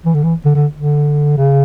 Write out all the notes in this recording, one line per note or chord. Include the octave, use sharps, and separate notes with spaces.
E3
D3
E3
D3
D3
D3
C#3